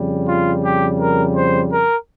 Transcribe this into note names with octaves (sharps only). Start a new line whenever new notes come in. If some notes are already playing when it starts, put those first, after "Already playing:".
Already playing: F2 C#3 G3
F4
G4
A#4
C5
A#4